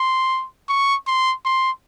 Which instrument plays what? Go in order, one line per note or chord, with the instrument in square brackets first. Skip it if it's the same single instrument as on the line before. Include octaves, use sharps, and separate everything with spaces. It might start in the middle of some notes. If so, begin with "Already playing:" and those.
Already playing: [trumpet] C6
C#6
C6
C6